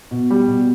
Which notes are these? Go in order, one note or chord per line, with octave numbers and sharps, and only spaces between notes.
B2
G3
B2